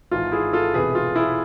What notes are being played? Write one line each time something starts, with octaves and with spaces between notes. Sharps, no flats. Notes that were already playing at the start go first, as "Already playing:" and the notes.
G#1 G#2 E3 F4
E4 G#4
F4 A4
E1 E2 C3 E3 G#4 B4
F4
E4 G#4